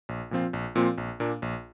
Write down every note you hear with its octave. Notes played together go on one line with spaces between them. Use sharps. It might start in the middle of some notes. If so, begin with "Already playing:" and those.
A#1
A#2 F3 C4 F4
A#1
A#2 F3 C4 F4
A#1
A#2 A#3 D4
A#1